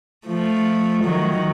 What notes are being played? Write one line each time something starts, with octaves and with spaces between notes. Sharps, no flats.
F3 A3
D#3 F#3